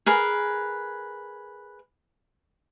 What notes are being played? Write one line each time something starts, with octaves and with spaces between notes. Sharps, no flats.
G#4 A#4 B4